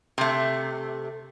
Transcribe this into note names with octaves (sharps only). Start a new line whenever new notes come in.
C3 A3